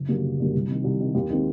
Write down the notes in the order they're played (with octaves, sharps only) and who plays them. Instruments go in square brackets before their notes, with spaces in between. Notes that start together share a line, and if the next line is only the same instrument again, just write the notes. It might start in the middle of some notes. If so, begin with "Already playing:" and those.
Already playing: [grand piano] F#1
F#2 D3 G3 A#3
F#1
F#2 D3 G3 A#3
C2
C3 D#3
C2
C3 D#3
D#2
D#3 G#3 C4